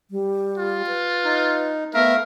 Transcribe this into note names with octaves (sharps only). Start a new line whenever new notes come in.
G3
F4
B4
D#4
A3 B3 A#4 E5 F5